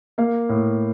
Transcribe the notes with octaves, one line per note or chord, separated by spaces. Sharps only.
A#3 F5
A2